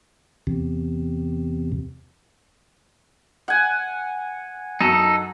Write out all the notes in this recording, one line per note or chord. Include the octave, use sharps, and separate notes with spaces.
E2 C3
F#5 G#5
F#2 D#4 A4